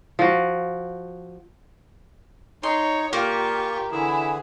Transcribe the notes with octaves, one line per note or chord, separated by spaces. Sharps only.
F3 F#4
D#4 C#5 C6
A#2 A#3 F4 G4 C#6
D3 E3 E4 G#4